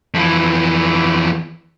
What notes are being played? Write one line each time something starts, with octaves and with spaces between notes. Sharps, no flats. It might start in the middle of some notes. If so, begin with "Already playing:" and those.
F2 E3